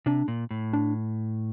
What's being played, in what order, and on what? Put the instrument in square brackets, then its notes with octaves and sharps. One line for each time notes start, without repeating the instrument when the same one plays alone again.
[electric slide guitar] C3 [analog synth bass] D4
[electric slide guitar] A#2
A2
[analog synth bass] D4